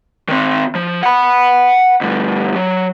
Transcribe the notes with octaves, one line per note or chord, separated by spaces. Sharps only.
D#3 C4
F3
F#5 B5
D2 G2
F#3